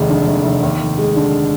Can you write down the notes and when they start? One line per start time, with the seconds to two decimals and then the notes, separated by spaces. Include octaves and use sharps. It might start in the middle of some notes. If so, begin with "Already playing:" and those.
Already playing: F1 D#2 G#3
0.10 D3
0.27 D#2
0.45 F1
0.63 D#2
0.81 F1
0.98 G#3
1.16 D3